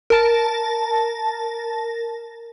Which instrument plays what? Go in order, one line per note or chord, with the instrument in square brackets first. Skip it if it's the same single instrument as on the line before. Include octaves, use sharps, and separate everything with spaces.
[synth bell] A#4 A5